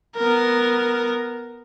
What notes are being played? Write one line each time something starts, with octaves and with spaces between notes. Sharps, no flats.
B3 A#4